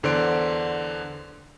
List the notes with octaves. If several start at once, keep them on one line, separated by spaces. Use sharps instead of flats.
E2 D3 C5 D5 C6 D7